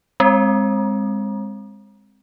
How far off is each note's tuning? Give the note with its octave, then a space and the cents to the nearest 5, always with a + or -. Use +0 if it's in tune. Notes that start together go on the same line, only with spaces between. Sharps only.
G#3 -25 C4 +0